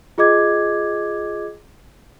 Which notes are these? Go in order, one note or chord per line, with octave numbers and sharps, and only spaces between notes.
F4 G#4 D#5 D6 G#6